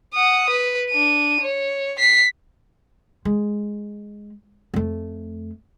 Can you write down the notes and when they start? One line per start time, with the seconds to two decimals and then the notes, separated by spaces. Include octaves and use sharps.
0.14 F#5 D#6
0.49 B4
0.90 D4 D#7
1.41 C#5
1.99 B6 C7
3.25 G#3
4.74 F2 A3